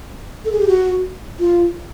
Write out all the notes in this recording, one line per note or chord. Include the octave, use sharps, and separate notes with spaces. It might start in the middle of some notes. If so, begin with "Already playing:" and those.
A4
G#4
G4
F#4
F4